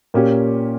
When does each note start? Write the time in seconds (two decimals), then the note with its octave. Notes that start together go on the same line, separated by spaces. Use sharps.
0.14 A#2 A#3 C#4 G4